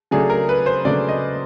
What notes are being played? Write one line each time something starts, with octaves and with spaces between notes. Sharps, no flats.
C#3 F#3 A3 D4 G#4
A#4
B4
C5
C#3 F#3 A3 D4 D5
D#5